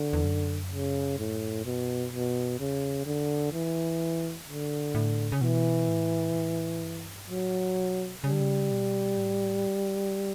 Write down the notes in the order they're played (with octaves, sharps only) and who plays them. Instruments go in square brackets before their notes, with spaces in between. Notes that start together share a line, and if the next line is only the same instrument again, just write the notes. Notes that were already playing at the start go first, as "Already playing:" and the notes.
Already playing: [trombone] D3
[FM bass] E2
F#2
[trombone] C#3
A2
B2
B2
[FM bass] E2 [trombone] C#3
[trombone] D3
E3
[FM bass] A2 [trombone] D3
[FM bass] A2
C#3
[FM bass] B2 [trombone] E3
[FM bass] A2
B2
A2
G2
[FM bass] A2 [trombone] F#3
[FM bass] B2
[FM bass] C#3 [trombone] G3
[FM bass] D3
C#3
B2
A2